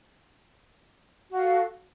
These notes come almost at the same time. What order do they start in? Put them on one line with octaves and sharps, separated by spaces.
F#4 F5 A4